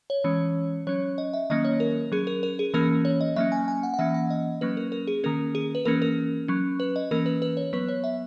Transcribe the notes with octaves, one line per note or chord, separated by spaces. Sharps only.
C#5
E3 G#3 C#4
F#3 C#4 C#5
D#5
E5
D#3 F#3 A#3 C#4 D#5
C#5
A#4
F#3 C#4 G#4
A#4
A#4
G#4
E3 A#3 C#4 A#4
C#5
D#5
F#3 A#3 C#4 E5
G#5
G#5
F#5
F#5
E3 A#3 C#4 E5
F#5
D#5
F#3 A#3 C#4 B4
A#4
A#4
G#4
D#3 A#3 C#4 A#4
G#4
B4
E3 A#3 C#4 A#4
A#4
F#3 C#4
B4
D#5
E3 A#3 C#4 A#4
B4
B4
C#5
F#3 B3 B4
C#5
E5